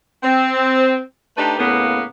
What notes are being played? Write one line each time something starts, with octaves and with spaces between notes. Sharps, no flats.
C4
A3 D4 D#4 G4 B4
A2 C#3 A#3 B3